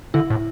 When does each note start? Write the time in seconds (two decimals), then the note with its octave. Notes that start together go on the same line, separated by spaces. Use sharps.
0.14 D3 E4
0.30 A2